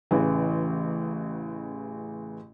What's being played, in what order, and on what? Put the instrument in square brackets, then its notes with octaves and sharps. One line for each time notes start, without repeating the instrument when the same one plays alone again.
[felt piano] A1 C#3 E3